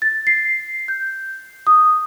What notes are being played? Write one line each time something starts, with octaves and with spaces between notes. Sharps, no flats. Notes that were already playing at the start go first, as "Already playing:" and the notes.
A6
C7
G6
D#6